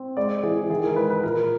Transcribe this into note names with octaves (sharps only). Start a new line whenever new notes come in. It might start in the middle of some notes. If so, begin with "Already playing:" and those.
Already playing: C4
G#3 D5
E3 G#4
D#3 G#4
A#4
G#3 B4
B4
A#2 A#4